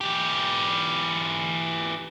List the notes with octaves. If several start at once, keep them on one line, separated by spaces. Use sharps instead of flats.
E3 G4